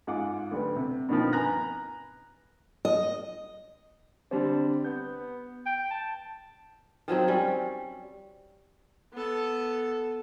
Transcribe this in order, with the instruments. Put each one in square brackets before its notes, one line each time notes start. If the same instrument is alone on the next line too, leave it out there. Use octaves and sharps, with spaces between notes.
[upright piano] G#2 F4 F#5 D6
D2 G3 B3
C3
G2 B2 D#3 F3
B4 G#5 A#5 F#6 A#6
[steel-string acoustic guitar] D#5
[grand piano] D3 G3 C4 [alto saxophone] D4
[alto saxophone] B3 [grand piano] G6
[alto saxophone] G5
A5
[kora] D#3 F3 F#3 C4
G3 C#4
[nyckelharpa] B3 A4